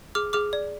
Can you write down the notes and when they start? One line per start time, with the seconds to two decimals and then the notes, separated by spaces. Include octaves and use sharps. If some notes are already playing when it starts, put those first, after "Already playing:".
0.15 G#4 D6 F6
0.33 G#4 D6 F6
0.53 D5